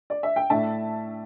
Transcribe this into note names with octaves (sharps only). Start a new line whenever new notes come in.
D5
E5
G5
A2 A3 D4 E5 A5